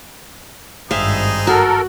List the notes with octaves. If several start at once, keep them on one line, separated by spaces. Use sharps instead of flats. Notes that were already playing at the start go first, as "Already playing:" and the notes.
G#1 G2 C4 D#4 G#4 E5 F5
F#4 A4 A#4